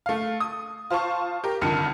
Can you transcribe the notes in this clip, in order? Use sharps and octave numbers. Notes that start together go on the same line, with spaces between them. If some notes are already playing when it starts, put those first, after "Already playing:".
A3 F5
D#6
F4 C5 F5 A5 C#6
G4 A#4
C2 F2 D3 D#3 F6 C#7